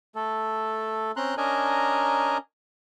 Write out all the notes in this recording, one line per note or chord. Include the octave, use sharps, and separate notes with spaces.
A3 A4
C4 C#4 A#5 C6 F#6
C#4 D4 A#4 D#5 G#5 A#5